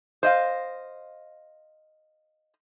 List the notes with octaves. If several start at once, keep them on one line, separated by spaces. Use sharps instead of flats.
C5 D#5 F5